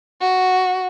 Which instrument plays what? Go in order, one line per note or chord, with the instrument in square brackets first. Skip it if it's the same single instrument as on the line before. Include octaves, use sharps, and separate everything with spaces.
[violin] F#4